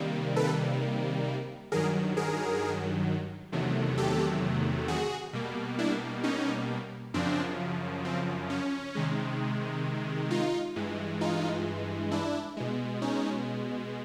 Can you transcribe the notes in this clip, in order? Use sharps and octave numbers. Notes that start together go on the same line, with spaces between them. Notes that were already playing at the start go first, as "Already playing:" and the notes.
Already playing: C3 D#3 G3 A#3
A4 B4
G2 D#3 F#3 G#4 A#4
G#4 A#4
E2 C3 D#3 F#3 A3
G4 A4
F#4 G#4
B2 G3 A#3
D4 E4
C#4 D#4
F#2 C#3 F3 C4 D4
C4
C#4
C3 D#3 G#3
D#4 F4
G2 E3 G#3
D#4 F4
D4 E4
B2 G#3
C#4 D#4